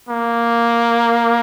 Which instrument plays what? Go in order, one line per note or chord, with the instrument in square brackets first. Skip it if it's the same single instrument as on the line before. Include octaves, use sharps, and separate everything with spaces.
[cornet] A#3